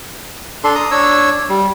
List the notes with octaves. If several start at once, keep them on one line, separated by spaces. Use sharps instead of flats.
D4 A4 C6
A#5 D#6
D4 C#5 E6
G3